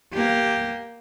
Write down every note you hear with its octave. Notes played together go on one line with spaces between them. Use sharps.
A#3 G4